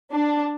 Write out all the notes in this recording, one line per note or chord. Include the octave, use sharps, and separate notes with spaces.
D4